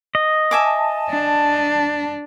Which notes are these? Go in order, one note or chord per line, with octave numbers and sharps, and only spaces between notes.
D#5
E5 G#5 A5 D6
D4